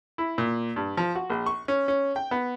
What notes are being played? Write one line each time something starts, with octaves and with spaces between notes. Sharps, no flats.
E4
A#2
G2
F3
F#4
A#1
C#6
C#4
C#4
G5
B3